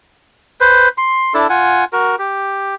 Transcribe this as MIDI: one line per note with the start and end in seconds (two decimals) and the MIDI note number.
0.61 0.88 71
0.61 0.88 72
0.98 1.33 84
1.34 1.47 62
1.34 1.47 64
1.34 1.47 69
1.50 1.84 65
1.50 1.84 78
1.50 1.84 80
1.93 2.16 66
1.93 2.16 70
2.19 2.75 67